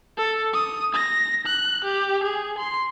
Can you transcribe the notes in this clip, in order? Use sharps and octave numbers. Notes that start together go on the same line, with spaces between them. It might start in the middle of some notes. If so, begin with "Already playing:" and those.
A4
D#6
A#6
F#6
G4
G#4
C6